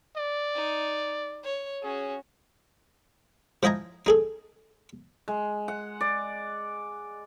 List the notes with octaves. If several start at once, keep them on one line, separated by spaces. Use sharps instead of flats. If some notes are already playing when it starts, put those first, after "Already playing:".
D5
D#4
C#5
C#4 F#4 G#4
F3 E4 D#5 G#5 A#5
D#4 G#4 A4
G#3
F#5
D5